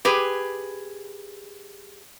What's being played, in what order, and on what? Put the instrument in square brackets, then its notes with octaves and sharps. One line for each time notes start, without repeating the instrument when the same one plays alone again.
[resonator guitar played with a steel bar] G4 G#4 B4